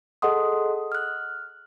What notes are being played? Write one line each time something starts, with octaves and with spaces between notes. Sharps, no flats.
G#4 A4 D#5 F#5 C6 D#6
F6 F#6